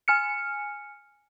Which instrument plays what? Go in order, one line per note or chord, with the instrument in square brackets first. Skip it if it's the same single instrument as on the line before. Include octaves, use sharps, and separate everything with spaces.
[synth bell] G#5 F6 C#7